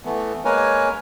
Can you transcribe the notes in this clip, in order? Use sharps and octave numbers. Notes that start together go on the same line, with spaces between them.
E3 A3 B3
G#3 A#3 A#4 B4 C#5 G#5